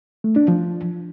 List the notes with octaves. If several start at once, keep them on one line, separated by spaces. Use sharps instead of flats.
A3
D4
F3